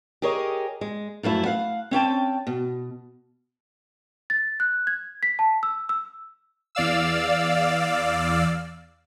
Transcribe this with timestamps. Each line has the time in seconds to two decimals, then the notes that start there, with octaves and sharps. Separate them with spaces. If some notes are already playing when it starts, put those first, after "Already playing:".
0.22 G4 G#4 A#4 C#5 D#5
0.81 G#3
1.23 F#2 F3 A3 E4
1.46 F5 F#5
1.91 C4 C#4 G5 A5
2.47 B2
4.30 A6
4.60 F#6
4.87 G#6
5.23 B6
5.39 A5
5.63 E6
5.89 E6
6.75 E2 D5 F5 E6